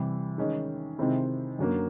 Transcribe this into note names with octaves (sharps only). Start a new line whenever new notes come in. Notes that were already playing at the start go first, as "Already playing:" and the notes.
Already playing: C3 E3 G3
D#3 G#3 C#4
C3 D#3 G#3 C4 E4
F#2 D3 F#3 A#3